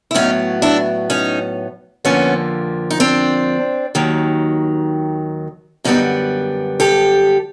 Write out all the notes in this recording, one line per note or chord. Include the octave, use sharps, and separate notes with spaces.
E4
A2 F#3 B3 C#4 D#4
D4 E4
C#4 D#4
F2 D3 F3 A#3 B3 C#4
D#4
C4 D4
D#2 D#3 F#3
F#2 D3 G3 B3 C#4 D#4
G4 A4